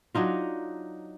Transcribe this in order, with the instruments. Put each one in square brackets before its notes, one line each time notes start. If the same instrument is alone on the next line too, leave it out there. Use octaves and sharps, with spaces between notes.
[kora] F#3 D4 D#4 F4